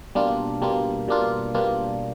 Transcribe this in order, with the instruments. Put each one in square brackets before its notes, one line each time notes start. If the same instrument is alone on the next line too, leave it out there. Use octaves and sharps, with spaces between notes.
[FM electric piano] B2 G3 A#3 D4 F4
B2 G3 A#3 D4 F4
B2 G3 A#3 D4 F4
B2 G3 A#3 D4 F4